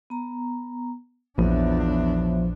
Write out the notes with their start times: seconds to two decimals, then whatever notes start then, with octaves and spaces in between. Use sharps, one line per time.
0.10 B3 A#5
1.38 A#1 E2 F3 B3 D4 C#5 E5